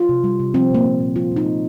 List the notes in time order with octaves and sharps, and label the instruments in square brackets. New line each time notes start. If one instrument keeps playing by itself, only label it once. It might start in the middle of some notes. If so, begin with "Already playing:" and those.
Already playing: [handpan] F4
C3
G3
C3
F3 C4
A#2 A#3
A#3
A#2
F3 F4
A#2
D#4
A#3